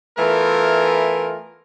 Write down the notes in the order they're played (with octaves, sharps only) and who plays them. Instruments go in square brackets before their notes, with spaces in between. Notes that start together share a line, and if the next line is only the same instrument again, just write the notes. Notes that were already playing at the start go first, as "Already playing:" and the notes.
[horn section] E3 A3 B3 F4 A#4